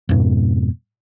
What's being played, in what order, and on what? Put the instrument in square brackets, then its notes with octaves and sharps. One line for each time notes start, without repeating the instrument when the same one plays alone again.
[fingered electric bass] F2 G#2 B2